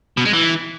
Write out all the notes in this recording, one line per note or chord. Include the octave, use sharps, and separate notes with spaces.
B2
G#3
E3